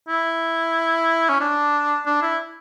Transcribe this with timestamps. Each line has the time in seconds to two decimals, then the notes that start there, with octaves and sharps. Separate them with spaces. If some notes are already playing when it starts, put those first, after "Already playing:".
0.09 E4
1.29 C#4
1.40 D4
2.06 D4
2.22 E4